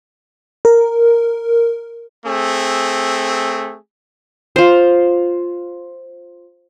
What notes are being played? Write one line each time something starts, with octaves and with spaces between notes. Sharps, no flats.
A#4
A3 C4 G#4
F4 C5